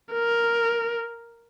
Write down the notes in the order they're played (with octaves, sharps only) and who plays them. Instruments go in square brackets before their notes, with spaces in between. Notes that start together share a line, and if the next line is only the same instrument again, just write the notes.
[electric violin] A#4